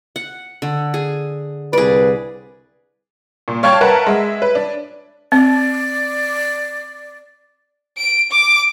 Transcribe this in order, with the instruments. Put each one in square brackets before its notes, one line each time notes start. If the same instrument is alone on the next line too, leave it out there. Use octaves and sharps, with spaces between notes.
[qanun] F#5
D3
G#4
[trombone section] C2 B4 [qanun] G#4 D5
[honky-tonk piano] A#2
C#5 F5 G5 A5 C#6 G#6
A#4 B4 E5 F#5 A5 A#5
G#3 E5
B4
D4
[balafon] C4 [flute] D5
[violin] D7
D6